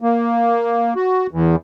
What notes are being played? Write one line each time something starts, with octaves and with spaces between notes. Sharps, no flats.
A#3
F#4
E2